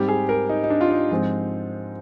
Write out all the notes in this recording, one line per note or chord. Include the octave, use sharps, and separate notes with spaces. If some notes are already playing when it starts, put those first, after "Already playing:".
Already playing: G#2 G3 C4 G4
G#4
A#4
D#4
D#4
D4
F4
D#4
G#2 F3 G#3 C4